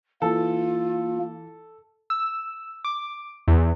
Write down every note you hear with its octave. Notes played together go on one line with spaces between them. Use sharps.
E3 A#3 F4 A4
E6
D6
E2